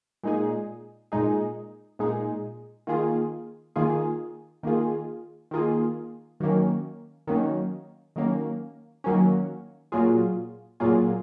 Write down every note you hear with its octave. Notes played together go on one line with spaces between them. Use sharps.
A#2 G#3 D#4 G#4
A#2 G#3 D#4 G#4
A#2 G#3 D#4 G#4
D#3 A#3 F4 G#4
D#3 A#3 F4 G#4
D#3 A#3 F4 G#4
D#3 A#3 F4 G#4
D#3 F#3 A#3 C#4
D#3 F#3 A#3 C#4
D#3 F#3 A#3 C#4
D#3 F#3 A#3 C#4
A#2 F#3 A#3 F4 G#4
A#2 F#3 A#3 F4 G#4